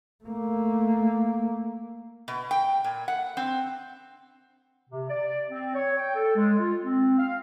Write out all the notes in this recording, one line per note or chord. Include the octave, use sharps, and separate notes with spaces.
A3 A#3
B2
G5
A#2
F#5
C4
C3
D5
C4
C#5
G5
A4
G#3
F4
C4
F5